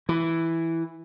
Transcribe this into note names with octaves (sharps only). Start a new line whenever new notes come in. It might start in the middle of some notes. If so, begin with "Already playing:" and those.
E3